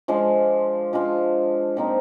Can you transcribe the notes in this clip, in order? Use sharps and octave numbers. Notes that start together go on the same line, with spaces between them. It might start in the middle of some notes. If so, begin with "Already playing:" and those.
F3 G#3 D4 F4
F3 G#3 D4 F4
A#2 F3 C4 D#4